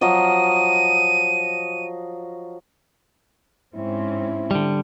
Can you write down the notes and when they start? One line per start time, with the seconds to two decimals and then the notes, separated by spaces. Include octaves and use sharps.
0.01 F3 F#3 D#5 D#7
3.75 G#2 C4 C#4 E4
4.51 D3 G3